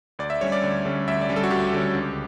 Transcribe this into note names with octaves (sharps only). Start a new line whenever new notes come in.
D2 D5
E5
D3 G3 C#4 C#5
D5
D2
D3 G3 C#4
D2 E5
D5
D3 G3 C#4
A4
F#4
D2 G4
D3 G3 C#4
C#2